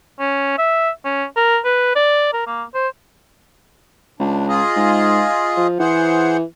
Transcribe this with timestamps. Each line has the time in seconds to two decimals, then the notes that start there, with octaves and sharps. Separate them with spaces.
0.19 C#4
0.58 E5
1.05 C#4
1.36 A#4
1.65 B4
1.95 D5
2.33 A#4
2.46 A#3
2.74 C5
4.20 C#2 D4
4.49 F4 G#4 D#5
4.76 G#2
5.57 F3
5.80 E3 G#4 C5 F#5